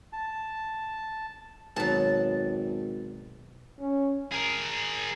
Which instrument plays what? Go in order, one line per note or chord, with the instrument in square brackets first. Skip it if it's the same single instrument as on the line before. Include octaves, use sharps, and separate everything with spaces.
[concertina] A5
[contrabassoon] G#1 [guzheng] B2 F#3 [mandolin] A5
[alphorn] C#4
[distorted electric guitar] G#4 A#4